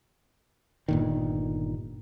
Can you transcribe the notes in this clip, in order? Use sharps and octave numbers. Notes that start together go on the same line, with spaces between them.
G1 A#2 D#3